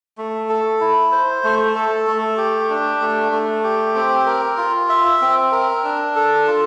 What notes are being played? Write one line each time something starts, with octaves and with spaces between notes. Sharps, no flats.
A3
A4
E4
C5
A3
A4
A3
G4
D4
A3
A3
G4
C4
A#4
F4
E5
C4
A#4
D4
A4
F4